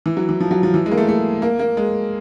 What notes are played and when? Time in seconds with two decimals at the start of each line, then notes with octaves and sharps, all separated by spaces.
0.06 E3
0.17 F#3
0.29 E3
0.40 F3
0.51 F#3
0.63 F3
0.74 E3
0.86 G#3
0.92 A#3
0.97 A3
1.09 A3
1.42 A#3
1.59 A#3
1.77 G#3